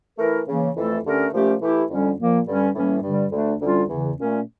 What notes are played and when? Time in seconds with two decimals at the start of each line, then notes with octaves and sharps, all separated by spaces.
0.19 E3 A3 E4 A#4
0.48 C#3 E3 A#3
0.76 F2 E3 A3 E4 A4
1.05 D3 A3 C#4 G4 A#4
1.33 A#2 F3 A3 C#4 G4
1.62 E3 A3 E4 G4
1.90 F2 D3 G3 C#4
2.18 A#2 F3 A#3
2.47 G2 D3 G3 C#4
2.75 A2 E3 G3 A#3 C#4
3.03 G2 D3 G3
3.32 D2 D3 A3 D4
3.60 D2 D3 G3 C#4 F4
3.89 E2 C#3 E3
4.17 A#2 A3 C#4